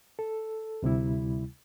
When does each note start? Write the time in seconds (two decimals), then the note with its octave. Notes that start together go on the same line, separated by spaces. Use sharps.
0.19 A4
0.82 D2 C3 G3 E4